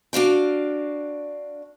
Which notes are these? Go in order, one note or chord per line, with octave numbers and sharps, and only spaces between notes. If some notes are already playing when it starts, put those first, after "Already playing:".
D4 F#4 F5 G5